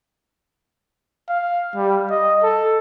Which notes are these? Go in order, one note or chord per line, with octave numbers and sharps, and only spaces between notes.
F5
G3
D#5
A4